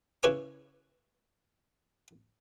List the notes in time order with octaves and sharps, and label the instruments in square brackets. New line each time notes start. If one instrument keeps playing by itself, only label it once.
[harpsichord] C#3 E4 B4 C#5 G#5 D6